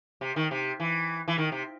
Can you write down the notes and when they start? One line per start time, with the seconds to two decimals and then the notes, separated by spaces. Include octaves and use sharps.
0.21 C3
0.36 D#3
0.51 C3
0.80 E3
1.28 E3
1.38 D#3
1.52 C3